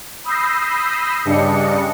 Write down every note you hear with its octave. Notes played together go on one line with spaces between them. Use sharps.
B5 D#6 E6 G6 A#6 C7
G2 C#3 G3 D4 D#5 C#7